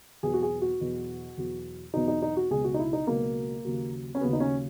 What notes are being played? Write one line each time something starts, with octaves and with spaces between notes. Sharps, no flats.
E2 B2 F#3 G#4
F#4
G#4
F#4
E2 B2 F#3
E2 B2 F#3
E2 B2 F#3 D#4
D#4
D#4
F#4
C#2 B2 F#3 G#4
F#4
D#4
E4
D#4
C#2 B2 F#3 A#3
D#2 C#3 F#3
C#4
D#2 C#3 F#3 B3
D#4
C#4